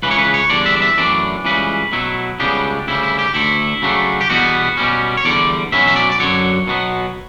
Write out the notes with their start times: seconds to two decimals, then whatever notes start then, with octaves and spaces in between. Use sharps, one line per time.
0.03 C#2 C#3 E3 B4
0.11 C#5
0.18 B4
0.34 C#5
0.50 E2 D3 G3 D4 D5
0.66 E5
0.76 D5
0.82 E5
0.97 F#2 E3 A3 D4 D5
1.44 C#2 C#3 E3 G3 B4
1.92 B2 F#3 A3 E4
2.40 C#2 C#3 G3 B3 D4 G4
2.87 D2 C#3 G3 E4
3.03 E4
3.19 G4
3.34 D2 D3 A3 E4
3.82 C#3 F#3 A3 D4
4.21 G4
4.30 E2 B2 G3 B3 F#4
4.77 B2 G3 C#4
5.17 C#5
5.25 E2 D3 G3 D5
5.72 B2 F#3 C#4 E4 E5
5.87 E5
5.96 D5
6.12 D5
6.19 F#2 D3 F#3 C#5
6.68 B2 F#3 B3